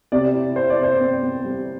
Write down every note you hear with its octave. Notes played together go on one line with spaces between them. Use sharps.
C3 D5
E4
E4 C5
D5
C3
C5
C4
C4
G3